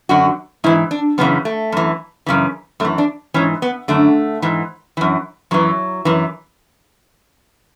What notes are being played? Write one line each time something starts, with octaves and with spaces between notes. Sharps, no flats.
F#2 D3 F#4
G#2 E3 E4
D4
F#2 C#3 E3 B3
A3
F#2 E3
F#2 C#3 E3
F#2 E3 A3
D4
G#2 E3 C#4
B3
F#2 D3 A3
G#2 E3
F#2 E3
F#2 E3 F#3
F#2 E3